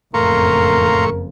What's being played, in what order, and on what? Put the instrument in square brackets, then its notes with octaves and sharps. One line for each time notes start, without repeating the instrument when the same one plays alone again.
[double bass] F#1 F2 [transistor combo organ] A2 C#6 [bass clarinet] A#4 [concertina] F5 A#5 C6